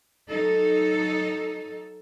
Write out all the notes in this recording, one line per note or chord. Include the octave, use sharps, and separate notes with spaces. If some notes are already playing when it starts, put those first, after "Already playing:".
F#3 D#4 A4